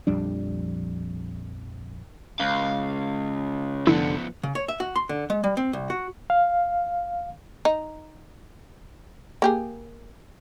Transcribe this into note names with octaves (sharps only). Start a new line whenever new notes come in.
A#1 F2 G3 D4
C#2 F5
F1 D3 F3 B3 E4
C#3
C#5
E5
F#4
C6
D3
G#3
G3
C4
C2
F#4
F5
D#4
A#3 G4 G#4